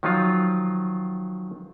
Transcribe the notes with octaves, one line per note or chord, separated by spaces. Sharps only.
D#3 F3 F#3 F4